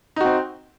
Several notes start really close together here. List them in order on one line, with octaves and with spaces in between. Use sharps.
D#4 F#4 C4